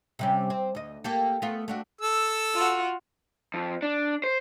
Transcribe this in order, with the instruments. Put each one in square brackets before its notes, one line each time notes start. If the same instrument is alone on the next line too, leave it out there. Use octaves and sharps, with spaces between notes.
[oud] C3 G3 C#4
C4
D2 D#5
A#3 G4 A4
A3 B3 F4
A3 D4 F#4
[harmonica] A4 E6
[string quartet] F4 F#4
[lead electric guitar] F2
D4
C5